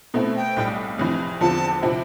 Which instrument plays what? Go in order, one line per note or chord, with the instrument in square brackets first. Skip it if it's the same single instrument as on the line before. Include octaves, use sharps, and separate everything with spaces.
[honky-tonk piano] B2 A3 C4 E4
[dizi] G5
[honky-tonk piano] B1 A2 G3
F1 F2 E3
[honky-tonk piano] E2 D3 F3 C4 F4 [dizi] A5
[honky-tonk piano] C3 F3 C4 E4